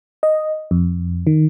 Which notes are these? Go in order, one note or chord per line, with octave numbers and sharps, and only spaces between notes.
D#5
F2
D#3